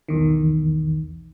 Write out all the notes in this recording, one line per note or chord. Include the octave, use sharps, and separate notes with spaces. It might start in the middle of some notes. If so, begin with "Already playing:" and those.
B1 E2 D#3